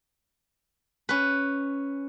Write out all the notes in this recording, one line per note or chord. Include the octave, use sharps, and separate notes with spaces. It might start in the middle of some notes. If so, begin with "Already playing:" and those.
C#4 B4